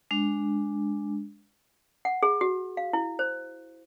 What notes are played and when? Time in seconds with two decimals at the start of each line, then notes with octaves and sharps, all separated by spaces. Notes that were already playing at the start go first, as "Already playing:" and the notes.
0.11 G#3 D4
2.05 F#5
2.23 G#4
2.41 F#4
2.77 F5
2.93 E4
3.19 C5